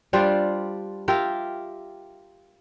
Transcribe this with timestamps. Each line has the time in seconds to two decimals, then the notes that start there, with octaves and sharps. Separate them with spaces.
0.13 G3 D4 F4 C5
1.08 F4 G4 A#4 E5